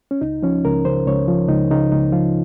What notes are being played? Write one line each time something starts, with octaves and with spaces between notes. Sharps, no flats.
C#4
C#2 D#4
F3 C#4
C#2 A#4
C#3 C5
C#2 C#5
F3
C#2 D#4
C#3 D#4
C#2 D#4
F3 F4